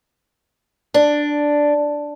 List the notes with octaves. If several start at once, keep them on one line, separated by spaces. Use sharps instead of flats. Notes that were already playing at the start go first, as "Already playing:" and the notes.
D4